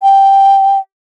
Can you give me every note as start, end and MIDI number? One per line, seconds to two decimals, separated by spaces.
0.02 0.78 79